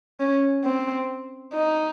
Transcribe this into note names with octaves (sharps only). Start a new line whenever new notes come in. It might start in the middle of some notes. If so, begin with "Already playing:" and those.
C#4
C4
D#4